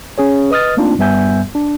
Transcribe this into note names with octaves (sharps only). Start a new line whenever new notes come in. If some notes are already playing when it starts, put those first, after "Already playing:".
C#4 G#4 C#5
B4 D#5 D#6 F6 A6
A3 A#3 C4 D4 D#4 F4
G2 G3 B3 E5 G#5 G6
D4